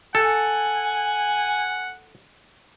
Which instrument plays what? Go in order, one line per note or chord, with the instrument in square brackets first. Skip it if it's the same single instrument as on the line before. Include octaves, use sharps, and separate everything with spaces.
[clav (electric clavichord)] A4 [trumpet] F#5 [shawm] G#5